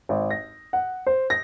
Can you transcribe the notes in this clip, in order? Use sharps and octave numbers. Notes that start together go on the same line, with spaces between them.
G#1
A#6
F#5
C5
A#6